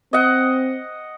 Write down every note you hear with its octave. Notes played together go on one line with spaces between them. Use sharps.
C4 D#5 F#5